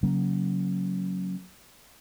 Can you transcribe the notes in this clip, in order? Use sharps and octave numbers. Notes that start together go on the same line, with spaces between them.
C#3 F#3 A#3 C#4